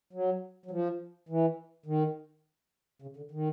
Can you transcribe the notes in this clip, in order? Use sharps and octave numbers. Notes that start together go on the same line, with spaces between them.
F#3
F#3
F3
E3
D#3
C#3
D3
D#3